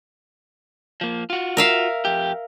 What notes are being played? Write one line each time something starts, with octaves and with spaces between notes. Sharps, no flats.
F3 A#3
F4 F#4
A#4 E5 F5
F2 G4